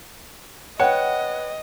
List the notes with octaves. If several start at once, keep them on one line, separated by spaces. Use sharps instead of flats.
B4 C#5 D#5 F#5 G5